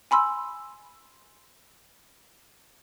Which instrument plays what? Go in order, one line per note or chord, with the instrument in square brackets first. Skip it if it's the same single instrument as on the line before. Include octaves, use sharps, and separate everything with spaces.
[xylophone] G#5 B5 C6 E6